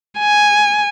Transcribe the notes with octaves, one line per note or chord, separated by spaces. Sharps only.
G#5